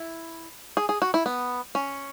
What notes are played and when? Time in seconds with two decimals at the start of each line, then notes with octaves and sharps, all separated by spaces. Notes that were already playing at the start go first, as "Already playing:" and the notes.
Already playing: E4
0.77 G#4
0.89 G#4
1.02 F#4
1.14 E4
1.26 B3
1.75 C#4